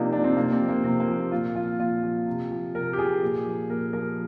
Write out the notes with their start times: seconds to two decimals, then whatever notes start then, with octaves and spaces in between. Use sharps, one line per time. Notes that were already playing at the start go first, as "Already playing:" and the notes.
Already playing: C3 F3 A#3 D4 D#4 F4
0.13 F3 D4
0.24 C4
0.36 C3 A#3
0.52 C4
0.60 F3
0.68 A#3
0.84 C3 C4
1.00 A#3
1.08 F3
1.32 A#2 F4
1.55 F3 F4
1.80 A#2 F4
2.03 F3
2.27 C3
2.51 F3
2.75 C3 A#4
2.93 G4
2.98 F3 G#4
3.22 A#2
3.46 F3
3.69 A#2 A#4
3.93 F3 A#4